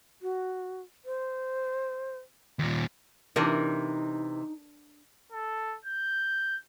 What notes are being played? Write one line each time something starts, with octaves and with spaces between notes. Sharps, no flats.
F#4
C5
D#2 A#2
C3 E3 D4 D#4 A#4
A4
G6